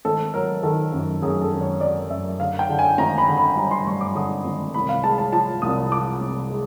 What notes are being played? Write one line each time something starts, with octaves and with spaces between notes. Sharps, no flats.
G#1 A4
F#3 A#4
D#3 A4
F#2
F#2 G#4
A4
G#1
C#5
F#3 D5
F#2 E5
D3 F5
G5
D3
G#5
G#1 A#5
B5
D3
B5
G3 A#5
C6
G2 C#6
D6
D3 D#6
G#1
C2 B5
F5
G#3 A5
A5
F3 A5
C2 D#6
F3 D6
C2
G#3